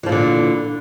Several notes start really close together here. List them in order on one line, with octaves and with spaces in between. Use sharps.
E3 F3 A#2 D3